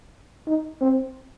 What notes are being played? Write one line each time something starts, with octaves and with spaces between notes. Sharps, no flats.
D#4
C4